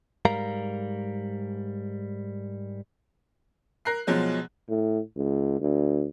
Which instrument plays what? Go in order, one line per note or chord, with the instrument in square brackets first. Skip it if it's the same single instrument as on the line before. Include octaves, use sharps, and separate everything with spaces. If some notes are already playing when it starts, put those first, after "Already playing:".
[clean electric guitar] G#2 G3 A#4 F5 A#5
[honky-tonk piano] A#4 F#6 C7
B2 F3 F#3 G#3
[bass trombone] A2
C#2
D2